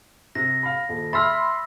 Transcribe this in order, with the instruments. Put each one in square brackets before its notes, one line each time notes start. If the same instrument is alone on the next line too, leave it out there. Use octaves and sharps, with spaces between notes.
[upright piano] C3 [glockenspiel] A#6
[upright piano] F5 B5
D#1
[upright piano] E5 F6 [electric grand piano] B5 C6 B6 [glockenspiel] E6 A6